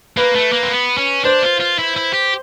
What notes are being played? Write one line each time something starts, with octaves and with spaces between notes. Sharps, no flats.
A#3 B4
A3
A#3
C4
B3
C#4
D4 C5
F4
F4
E4
E4
G4